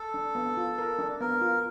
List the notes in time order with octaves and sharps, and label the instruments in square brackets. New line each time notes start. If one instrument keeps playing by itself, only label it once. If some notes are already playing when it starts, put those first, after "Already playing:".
Already playing: [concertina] A4
[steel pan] D4
B3
F4
A#4
D4
[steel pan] B3 [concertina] A#4
[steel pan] F4